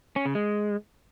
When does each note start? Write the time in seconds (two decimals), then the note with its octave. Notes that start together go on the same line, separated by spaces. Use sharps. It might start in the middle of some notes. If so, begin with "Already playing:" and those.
0.16 C#4
0.26 C#3
0.35 G#3